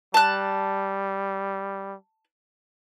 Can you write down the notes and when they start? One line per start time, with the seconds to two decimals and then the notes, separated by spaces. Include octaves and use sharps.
0.14 G3 A5 F#6